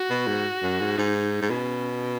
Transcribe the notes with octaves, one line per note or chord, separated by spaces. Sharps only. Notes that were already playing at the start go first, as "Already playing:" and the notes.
Already playing: F#4
B2
G#2
F#2
G#2
G#2 D#4
G#2
B2 C#4